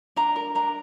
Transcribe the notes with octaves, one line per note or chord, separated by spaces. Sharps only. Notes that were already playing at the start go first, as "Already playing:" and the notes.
D4 A#5
A#4
D4 A#5